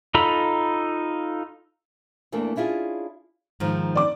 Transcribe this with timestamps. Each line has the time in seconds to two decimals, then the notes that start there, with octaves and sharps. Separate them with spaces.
0.15 D#4 F4 A4 A#5 B5
2.32 E2 E3 A3 A#3 D4
2.56 C#4 D4 E4 F4 G#4
3.60 G#2 D#3 F3
3.95 D5 D6